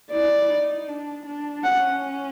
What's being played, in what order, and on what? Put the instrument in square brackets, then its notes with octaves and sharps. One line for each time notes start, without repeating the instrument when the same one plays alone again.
[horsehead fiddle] E4 [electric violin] D5
[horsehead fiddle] D#4
D4
D4
[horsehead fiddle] C#4 [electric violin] F#5